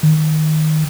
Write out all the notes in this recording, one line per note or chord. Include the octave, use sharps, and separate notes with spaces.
D#3